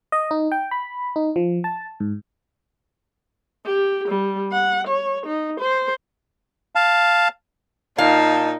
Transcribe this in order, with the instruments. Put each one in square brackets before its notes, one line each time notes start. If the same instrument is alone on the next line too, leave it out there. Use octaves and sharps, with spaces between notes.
[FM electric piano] D#5
D#4
G5
B5
D#4
F3
A5
G#2
[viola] G4
G3
F#5
C#5
D#4
C5
[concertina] F5 A5
[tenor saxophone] A#2 [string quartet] D#4 [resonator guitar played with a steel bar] F5 [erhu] A5